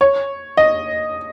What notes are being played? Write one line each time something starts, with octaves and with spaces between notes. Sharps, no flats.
C#5
D#5